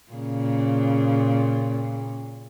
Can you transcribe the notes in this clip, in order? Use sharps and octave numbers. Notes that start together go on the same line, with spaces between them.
A#2 C#3